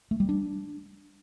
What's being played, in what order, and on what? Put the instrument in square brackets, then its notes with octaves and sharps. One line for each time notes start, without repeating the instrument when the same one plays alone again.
[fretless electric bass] A3
G3
D4